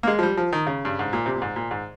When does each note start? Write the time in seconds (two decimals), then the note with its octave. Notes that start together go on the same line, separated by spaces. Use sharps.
0.03 A#3
0.07 G#3
0.19 F3
0.23 G3
0.37 F3
0.52 D#3
0.67 C#3
0.85 G2
0.99 G#2
1.13 A#2
1.26 C3
1.36 A#2
1.42 G#2
1.56 A#2
1.71 G#2